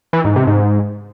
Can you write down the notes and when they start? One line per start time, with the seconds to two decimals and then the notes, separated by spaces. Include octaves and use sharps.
0.13 E3
0.24 G#2
0.36 C3
0.47 G#2